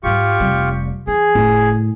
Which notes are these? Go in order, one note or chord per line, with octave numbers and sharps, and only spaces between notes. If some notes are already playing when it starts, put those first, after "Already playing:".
G#2 G3 F4 G4 C#6
F1 G3
E3 G#4
F#1 A2